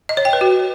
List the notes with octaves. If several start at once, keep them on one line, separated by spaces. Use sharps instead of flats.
D#5
C#5
G5
B4
F#4